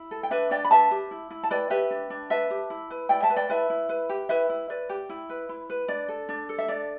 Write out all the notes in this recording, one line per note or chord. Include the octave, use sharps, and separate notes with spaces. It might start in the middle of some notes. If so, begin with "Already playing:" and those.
Already playing: E4
A4
G5
D4 B4 E5
D4 D5 G5
B5
B4 E5 A5
G4
E4
E4
A5
B4 D5 G5
G4 B4 E5
D4
D4
B4 E5 A5
G4
E4
B4
E4 D5 G5
E5 A5
B4
D5 G5
E4 B4 E5
E4
B4
G4
E4 B4 E5
E4
B4 D5
G4
E4
B4
E4
B4
D4 D5
A4
D4
A4
E5
D4 D5